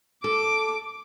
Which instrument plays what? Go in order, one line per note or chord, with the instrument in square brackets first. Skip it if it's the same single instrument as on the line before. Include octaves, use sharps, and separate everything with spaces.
[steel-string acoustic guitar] A4 [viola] D6